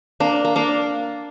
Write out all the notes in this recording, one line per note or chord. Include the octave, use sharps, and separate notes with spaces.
A#3 D4
A#3
A#3 D4